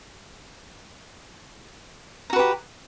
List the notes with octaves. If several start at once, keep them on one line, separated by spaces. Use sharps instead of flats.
F#4 G4 B4 A#5